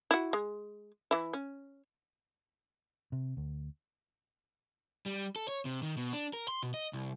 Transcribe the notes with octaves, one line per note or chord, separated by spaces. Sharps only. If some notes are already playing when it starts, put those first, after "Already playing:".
E4 F#4
G#3
E3 E4
C#4
C3
D2
G3
A4
C#5
C3
D#3
B2
D4
A#4
C6
B2
D#5
C2